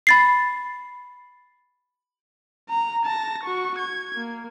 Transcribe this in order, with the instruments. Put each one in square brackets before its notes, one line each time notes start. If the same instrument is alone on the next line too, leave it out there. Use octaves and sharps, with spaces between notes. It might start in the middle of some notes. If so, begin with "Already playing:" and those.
[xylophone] B5 A6 C7
[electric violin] A#5
A5 A#6
F#4 C#6
G#6
A#3